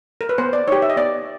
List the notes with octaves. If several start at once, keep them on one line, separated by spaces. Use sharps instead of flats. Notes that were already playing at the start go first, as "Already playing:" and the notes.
A#4
B4
B3 C5
D5
D#4 G4 C#5
E5
D#5
B3 D5